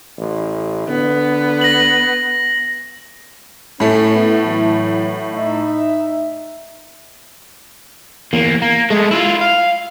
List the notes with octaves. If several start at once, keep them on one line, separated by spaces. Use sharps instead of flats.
A1
D3 B3
A#6 F#7
A2 A3 C#4
B3 E4
E3 F#3
D#4 E5
E2 A#3
A#3
G#3 A3
E4 F4
F5